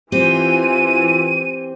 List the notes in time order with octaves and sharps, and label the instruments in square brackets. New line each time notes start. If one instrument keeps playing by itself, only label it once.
[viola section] E3 [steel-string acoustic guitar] C4 G4 [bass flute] F4 [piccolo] D#7